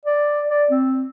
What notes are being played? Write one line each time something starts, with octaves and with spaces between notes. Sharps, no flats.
D5
D5
C4